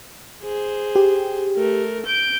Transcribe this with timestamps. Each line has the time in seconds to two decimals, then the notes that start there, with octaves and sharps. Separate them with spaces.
0.44 G#4 C5
0.95 G4
1.56 A3 A#4
2.06 G6 D7